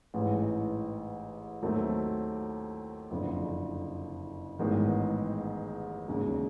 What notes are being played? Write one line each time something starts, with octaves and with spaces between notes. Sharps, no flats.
A1 G#2 E3
D#2 D#3 F#3 A3 C4
F#1 F2 D3
A1 G#2 D#3 G#3 B3
E1 D#2 C#3